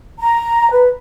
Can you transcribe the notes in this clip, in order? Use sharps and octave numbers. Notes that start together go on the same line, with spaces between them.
A#5
B4